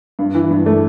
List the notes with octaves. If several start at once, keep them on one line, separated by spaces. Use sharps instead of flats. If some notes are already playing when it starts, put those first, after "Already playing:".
G2
E3
G2
A3